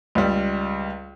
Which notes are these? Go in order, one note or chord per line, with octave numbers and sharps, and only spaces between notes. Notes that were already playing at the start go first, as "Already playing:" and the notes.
C#2 G3